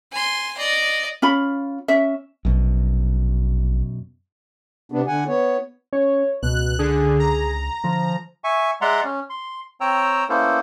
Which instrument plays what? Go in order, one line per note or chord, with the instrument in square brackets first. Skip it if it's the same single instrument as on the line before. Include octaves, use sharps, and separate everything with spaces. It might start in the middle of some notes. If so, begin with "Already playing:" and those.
[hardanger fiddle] G#5 C6
D5 D#5
[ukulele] C#4 F4 B5
C#4 E5
[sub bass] A#1 [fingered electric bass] F#2 B2
[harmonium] C3 B3 D4
D3 F#5 G#5
B3 C#5
[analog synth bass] C#4 [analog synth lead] C#5
[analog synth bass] C#2 [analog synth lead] B2 [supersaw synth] F#6
[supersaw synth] D3 [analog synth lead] G#4
[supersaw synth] A#5
[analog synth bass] D3 [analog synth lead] F3
[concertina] E5 G#5 C#6
G#3 D5 E5 F#5 A#5 C6
C#4
C6
C4 C#5 G5 A#5 E6
A#3 B3 C#4 E4 A4 C5